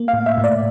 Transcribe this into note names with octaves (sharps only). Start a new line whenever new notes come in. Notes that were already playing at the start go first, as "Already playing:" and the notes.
Already playing: A#3
F5
A2
E5
A2
D5